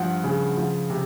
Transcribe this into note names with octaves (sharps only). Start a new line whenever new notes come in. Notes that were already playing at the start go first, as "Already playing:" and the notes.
Already playing: G2 F3 F#5
C#3
F3
C3